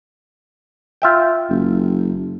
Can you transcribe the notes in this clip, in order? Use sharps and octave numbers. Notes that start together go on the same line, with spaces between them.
F4 E5 G5
F#1